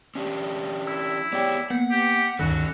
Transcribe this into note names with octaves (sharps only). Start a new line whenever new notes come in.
C#4 D4 G4
E4 E6
B3 G4 C#5 D5 G5
A#3 B3 F#5
G4
D2 G2 D#3 C#4 F#4 A4